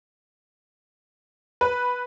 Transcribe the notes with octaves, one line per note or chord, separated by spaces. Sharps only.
B4